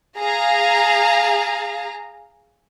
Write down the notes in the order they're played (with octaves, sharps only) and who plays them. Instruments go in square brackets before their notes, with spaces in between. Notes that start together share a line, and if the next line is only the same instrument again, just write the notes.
[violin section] G#4 F5 A#5